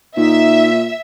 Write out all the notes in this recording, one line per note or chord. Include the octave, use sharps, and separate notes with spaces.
A#2 D#4 E5